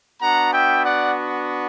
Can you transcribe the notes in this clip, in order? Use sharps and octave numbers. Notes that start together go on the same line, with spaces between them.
B3 D4 F#4 F#5 A#5
E5 G5
D5 F#5